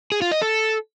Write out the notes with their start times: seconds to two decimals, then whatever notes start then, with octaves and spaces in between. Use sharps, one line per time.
0.12 G#4
0.22 F4
0.32 D#5
0.42 A4